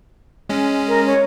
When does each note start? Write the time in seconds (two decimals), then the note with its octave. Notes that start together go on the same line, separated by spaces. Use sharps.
0.49 G#3 C#4
0.88 A#4
1.07 C#5